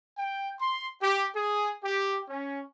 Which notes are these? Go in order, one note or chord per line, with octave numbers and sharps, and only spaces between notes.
G5
C6
G4
G#4
G4
C#4